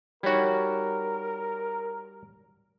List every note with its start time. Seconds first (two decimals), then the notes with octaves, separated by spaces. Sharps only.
0.23 G3 D#4 F#4 A#4 C#5 G#6